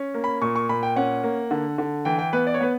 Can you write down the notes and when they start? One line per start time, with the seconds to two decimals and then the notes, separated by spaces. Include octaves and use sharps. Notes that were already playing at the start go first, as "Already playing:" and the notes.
Already playing: C#4
0.14 A#3
0.24 B5
0.42 A#2 C#6
0.56 C#6
0.69 A#2 B5
0.83 G5
0.96 C#4 F#5
1.24 A#3
1.51 D3
1.78 D3
2.05 E3 G5
2.19 G5
2.33 B3 B4
2.47 D5
2.54 C#5
2.60 B3 B4